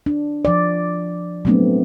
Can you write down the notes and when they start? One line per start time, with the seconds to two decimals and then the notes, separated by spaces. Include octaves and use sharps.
0.06 D4
0.45 F3 D5
1.45 F#3 G#3 A3 B3 C4 D4